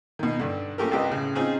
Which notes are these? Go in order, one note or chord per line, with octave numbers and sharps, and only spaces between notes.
B2 D#3
G2 D3
A3 C#4 F4 G4 A4 A#4
C2 G4 B4 D#5
A2 C#3
C4 C#4 D#4 F4 G#4